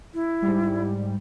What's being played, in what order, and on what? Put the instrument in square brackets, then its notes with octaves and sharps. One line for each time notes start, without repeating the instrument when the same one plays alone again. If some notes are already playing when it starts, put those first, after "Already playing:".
[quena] E4
[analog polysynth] G#2 G3